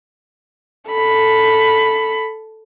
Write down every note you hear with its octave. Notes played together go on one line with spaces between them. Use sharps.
A4 B5